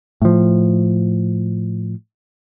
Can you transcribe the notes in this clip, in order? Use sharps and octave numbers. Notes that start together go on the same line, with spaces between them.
A2 F3